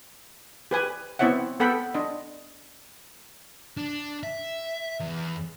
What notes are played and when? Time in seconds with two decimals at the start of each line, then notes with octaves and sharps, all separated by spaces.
0.71 G4 B4 G#5
1.19 B3 C4 E4 C#5 E5 F#5
1.60 B3 A4 F#5 G5 B5
1.94 D4 D#5
3.77 D4
4.23 E5
5.00 E2